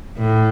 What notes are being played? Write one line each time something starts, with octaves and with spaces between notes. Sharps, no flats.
A2